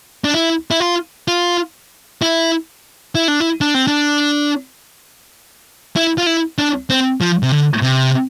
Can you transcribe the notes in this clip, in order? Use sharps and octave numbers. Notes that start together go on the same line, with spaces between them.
D4
E4
E4
F4
F4
E4
E4
D4
E4
D4
C4
D4
E4
F4
E4
D4
C4
F3
C3
D3
C3